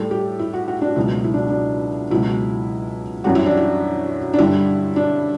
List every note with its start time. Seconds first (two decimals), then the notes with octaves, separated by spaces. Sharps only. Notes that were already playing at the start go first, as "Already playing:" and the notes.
Already playing: A2 G3 A4
0.11 G4
0.39 E4
0.53 F#4
0.68 F#4
0.81 D4
0.96 C#2 B2 F#3 E4
1.24 E4
1.34 D4
1.50 D4
2.10 C#2 B2 F#3 E4
3.24 F#2 E3 G3 F#4
3.35 E4
3.46 D4
3.57 E4
4.33 D4
4.39 G2 D3 G3 E4
4.96 D4